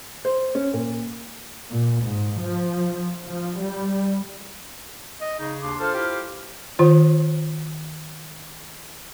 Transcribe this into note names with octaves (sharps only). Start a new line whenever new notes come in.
C5
C#4
A#2
A#2
G#2
F3
F3
G3
D#5
C#3 D#4
D#2 D4 C6 D6
F4 A4 C5 F6
E4 G4
D#3 F4 C5